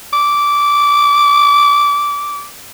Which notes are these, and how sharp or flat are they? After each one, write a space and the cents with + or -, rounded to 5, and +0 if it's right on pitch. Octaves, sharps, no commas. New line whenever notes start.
D6 -15